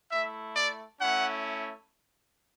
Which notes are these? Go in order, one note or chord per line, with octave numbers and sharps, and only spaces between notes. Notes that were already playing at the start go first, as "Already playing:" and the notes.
A3 E4 E5
D5
A3 C#4 E4 F#5